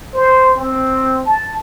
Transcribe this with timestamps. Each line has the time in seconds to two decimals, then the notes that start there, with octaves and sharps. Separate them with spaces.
0.13 C5
0.57 C4
1.26 A5